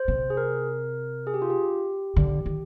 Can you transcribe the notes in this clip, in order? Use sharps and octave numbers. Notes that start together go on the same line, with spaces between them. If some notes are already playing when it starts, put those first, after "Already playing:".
Already playing: C5
C3
G#4
A#4
G#4
G4
F4
G4
D3
D#3